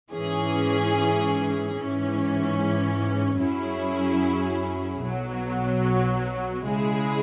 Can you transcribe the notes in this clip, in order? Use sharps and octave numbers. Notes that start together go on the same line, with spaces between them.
G#2 E3 C#4 G#4
G#2 E3 C#4
F#2 F#3 C#4 E4 G#4
B1 B2 F#3
C#3 G#3 E4 G#4